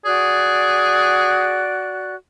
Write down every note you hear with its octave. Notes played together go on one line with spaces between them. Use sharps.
F#4 G#4 D5 F#6